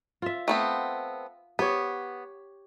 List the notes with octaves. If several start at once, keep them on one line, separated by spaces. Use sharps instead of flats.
F4 E5
A3 B3 C4
B3 G4 C#5